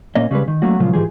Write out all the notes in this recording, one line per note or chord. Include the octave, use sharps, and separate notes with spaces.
A#2 A#3 C#4 C#5 D#5
C#3 G3 G#3 B4
D#3
F#3 A3 A#3 C#4 F#4
A#2 C#3 F3 F#3 G#3 F4
G#2 D#3 E3 F4 G4 G#4